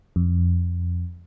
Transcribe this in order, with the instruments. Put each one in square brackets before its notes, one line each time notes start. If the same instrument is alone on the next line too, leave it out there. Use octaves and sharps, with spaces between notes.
[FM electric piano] F2